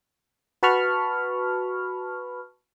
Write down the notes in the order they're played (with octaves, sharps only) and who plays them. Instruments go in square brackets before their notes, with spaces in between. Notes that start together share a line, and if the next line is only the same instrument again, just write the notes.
[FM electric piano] F#4 B4 A5 B5 C#6 F6